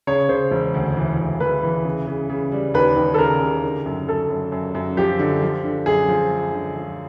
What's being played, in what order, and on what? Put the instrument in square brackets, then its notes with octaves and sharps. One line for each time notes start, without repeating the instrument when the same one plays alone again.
[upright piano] C#3 [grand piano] C#5
[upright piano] C#3 [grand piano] C5
[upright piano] E1
D2
E3
D2
[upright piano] E1 [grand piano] B4
[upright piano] E3
C#3
C#3
C#3
G3
[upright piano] D#2 [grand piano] B4
[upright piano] D#2
[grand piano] A4
[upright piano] C#3 [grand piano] A#4
[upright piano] C#3
D3
F#2
[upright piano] F#2 [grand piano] A4
[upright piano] F#2
F#2
F#2
[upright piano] F3 [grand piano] G4
[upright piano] D3
F3
D3
[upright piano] F#2 [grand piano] G#4
[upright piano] F3
G#3
D3
F3